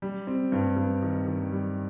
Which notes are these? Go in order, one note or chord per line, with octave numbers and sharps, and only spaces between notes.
G3
C4
G2
G2
D#3
D#3
G3